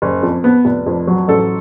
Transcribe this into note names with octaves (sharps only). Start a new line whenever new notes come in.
F#1
F2
B3
F1
F2
F#3
A1 A4